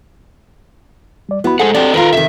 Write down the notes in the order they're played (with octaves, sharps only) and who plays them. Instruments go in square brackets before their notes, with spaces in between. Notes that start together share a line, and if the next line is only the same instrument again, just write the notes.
[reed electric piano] G3 D5
[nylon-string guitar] B3 [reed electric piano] E4 F#4 B5
[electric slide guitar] G#3 C5 F#5 [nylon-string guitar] G#4 [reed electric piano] A4
[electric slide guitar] C4 D4 D5 [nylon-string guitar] F#4 G4
[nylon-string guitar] D#3 F4 [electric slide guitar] A#4 B4 A#5
[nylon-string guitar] C3 D#3 [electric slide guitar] E5